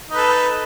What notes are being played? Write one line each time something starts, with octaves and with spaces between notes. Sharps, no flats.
D#4 A4 B4